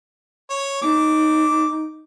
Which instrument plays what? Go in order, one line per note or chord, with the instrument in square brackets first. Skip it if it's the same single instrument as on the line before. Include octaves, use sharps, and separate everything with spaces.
[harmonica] C#5
[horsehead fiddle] D#4 [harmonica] D6